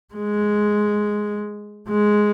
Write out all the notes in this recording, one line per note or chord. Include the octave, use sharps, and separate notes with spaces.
G#3
G#3